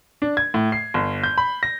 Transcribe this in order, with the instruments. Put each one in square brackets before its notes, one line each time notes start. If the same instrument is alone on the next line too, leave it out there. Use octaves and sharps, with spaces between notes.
[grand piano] D4
G#6
A2
C7
G1
G6
B5
A#6